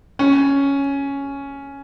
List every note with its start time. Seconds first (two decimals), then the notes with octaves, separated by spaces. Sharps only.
0.19 C#4